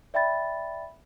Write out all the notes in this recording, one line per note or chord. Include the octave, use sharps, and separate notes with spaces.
D5 E5 G5 B5 A6